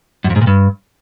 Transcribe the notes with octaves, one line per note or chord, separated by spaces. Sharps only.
F#2
F2
G#2
A#2
G2